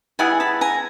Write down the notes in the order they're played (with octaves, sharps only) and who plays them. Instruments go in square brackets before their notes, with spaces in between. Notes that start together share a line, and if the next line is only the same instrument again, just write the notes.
[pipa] G3 B3 E4 G#4 [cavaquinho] F#5 G#5
[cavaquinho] A5 B5
G#5 A#5